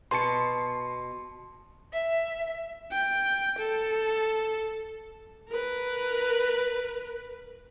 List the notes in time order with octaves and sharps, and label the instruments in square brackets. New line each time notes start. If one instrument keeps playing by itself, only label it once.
[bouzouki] B2 B4 A5 [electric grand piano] C6 C#7
[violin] E5
[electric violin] G5
A4
[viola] A#4 B4